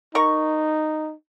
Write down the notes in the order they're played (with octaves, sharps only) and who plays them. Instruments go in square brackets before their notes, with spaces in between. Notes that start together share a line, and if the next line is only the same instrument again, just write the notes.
[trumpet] D#4 [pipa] A#4 A#5 C#6